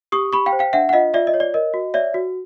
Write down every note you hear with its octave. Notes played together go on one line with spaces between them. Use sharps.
G4 C#6 D#6
G4 B5 C#6
F5 G5
C5
F5 G5
D4 E5 F#5
F#5
F4 D#5 F5
F4 D5 E5
D#5
C#5
D5
A#4 D#5
F#4
C#5 D5 E5
F#4